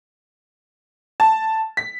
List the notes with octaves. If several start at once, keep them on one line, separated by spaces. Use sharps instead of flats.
A5
B6